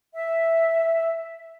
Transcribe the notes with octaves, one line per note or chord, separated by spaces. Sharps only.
E5